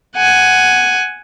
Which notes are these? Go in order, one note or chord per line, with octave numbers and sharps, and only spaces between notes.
F#5 G#5